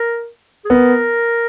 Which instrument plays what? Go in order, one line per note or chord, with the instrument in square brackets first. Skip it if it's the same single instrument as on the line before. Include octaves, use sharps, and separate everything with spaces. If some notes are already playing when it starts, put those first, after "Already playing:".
Already playing: [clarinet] A#4
G#4
[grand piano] B3 [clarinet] A#4